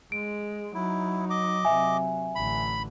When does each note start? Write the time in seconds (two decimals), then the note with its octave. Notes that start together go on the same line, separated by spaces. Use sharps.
0.12 G#3 D7
0.75 F#3 D#4 E4
1.30 D#5 D6
1.65 C3 F#3 E5 G#5
2.35 A1 D3 B5